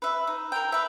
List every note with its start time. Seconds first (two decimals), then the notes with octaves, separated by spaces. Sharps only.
0.02 B4 E5
0.27 D#4
0.52 A#4 F5 G5
0.72 B4 E5